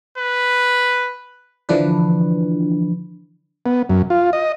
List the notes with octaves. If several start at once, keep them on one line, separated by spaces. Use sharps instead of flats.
B4
D3 E3 F3 D4 B4
B3
F#2
F4
D#5